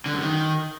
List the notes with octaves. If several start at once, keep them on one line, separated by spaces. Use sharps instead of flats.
D3
F#2
D#3